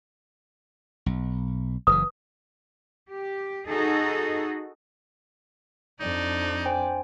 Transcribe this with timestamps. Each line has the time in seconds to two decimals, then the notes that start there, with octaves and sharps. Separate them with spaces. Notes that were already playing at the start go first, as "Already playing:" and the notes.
1.06 B1
1.87 F#1 B2 E3 B4 D#6
3.08 G4
3.67 D#4 F#4 G#4 A4 D#5
6.00 F2 D4 D#4 D5
6.66 C5 G5 G#5